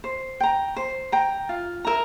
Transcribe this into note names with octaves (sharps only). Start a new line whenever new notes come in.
C5
G5 A#5
C5
G5 A#5
F4
A#4 E5 A#5